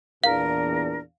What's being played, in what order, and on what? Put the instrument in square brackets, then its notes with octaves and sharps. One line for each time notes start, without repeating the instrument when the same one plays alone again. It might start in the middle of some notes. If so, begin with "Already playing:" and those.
[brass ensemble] E2 A#2 D4 [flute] A#4 [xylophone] F5